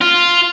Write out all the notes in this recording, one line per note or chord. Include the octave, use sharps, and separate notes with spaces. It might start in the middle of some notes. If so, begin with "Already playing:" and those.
F4